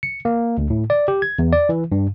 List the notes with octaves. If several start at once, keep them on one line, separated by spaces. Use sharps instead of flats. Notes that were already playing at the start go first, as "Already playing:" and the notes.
C#7
A#3
D2
A2
D5
G4
G#6
E2
D5
E3
G2